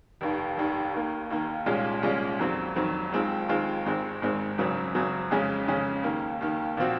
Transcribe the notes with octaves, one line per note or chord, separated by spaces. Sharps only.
F1 D#2 D#3
F1 D#2 D#3
D#2 D#3 A#3
D#2 D#3 A#3
C2 A#2 G#3 C#4 F4
C2 A#2 G#3 C#4 F4
F2 D#3 F#3 C4
F2 D#3 F#3 C4
D#2 D#3 G#3 C4 F4
D#2 D#3 G#3 C4 F4
G#1 G#2 D#3 G#3 C4
G#1 G#2 D#3 G#3 C4
G#1 F#2 C#3 F#3 C4
G#1 F#2 C#3 F#3 C4
F2 C#3 G#3 C#4
F2 C#3 G#3 C#4
D#2 D#3 A#3
D#2 D#3 A#3
A#2 F3 C4 F#4